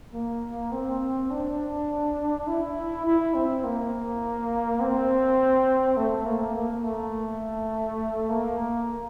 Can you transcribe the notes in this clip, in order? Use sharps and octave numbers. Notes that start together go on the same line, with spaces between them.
A#3
C4
D4
E4
E4
C4
A#3
C4
A3
A#3
A#3
A3
A#3